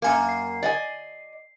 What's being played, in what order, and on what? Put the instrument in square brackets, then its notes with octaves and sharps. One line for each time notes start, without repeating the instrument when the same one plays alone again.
[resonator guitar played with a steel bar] F#2 A#3 [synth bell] F5 G#5
[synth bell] C7
[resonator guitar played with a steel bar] D5 D#5 G#5